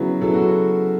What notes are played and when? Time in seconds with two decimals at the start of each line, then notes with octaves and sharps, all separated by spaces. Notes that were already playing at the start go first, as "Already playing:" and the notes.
Already playing: C#3 F#3 B3 E4
0.21 C#3 F#3 B3 E4 A4
0.34 F#4